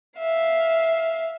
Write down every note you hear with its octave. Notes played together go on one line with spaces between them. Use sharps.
E5 F5